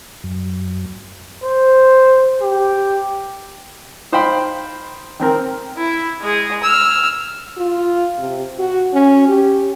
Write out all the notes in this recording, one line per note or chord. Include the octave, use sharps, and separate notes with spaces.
F#2
C5
G4
D#4 C5 F5 G5 B5
D#3 C4 A#4
E4
G#3 G#4
E6 F6
F4
C3
F#4
C#4
G4